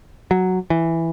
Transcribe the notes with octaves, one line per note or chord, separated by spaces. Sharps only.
F#3
E3